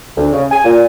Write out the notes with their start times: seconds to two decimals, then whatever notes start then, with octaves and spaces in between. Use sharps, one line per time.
0.17 D2
0.32 C#3
0.52 G#5
0.65 A#2